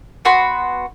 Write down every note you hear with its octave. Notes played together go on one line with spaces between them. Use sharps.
B3 F#4 B5 C6